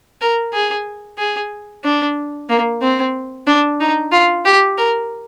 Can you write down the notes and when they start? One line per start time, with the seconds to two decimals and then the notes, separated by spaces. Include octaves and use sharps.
0.21 A#4
0.53 G#4
1.18 G#4
1.84 D4
2.49 A#3
2.82 C4
3.47 D4
3.80 D#4
4.12 F4
4.45 G4
4.78 A#4